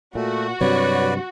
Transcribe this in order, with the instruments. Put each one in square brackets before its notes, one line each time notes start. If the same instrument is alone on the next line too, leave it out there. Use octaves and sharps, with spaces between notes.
[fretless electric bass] A#2 [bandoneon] A3 [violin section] F#4
[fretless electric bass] G2 C3 F#3 [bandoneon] B4 D5 [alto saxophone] C#5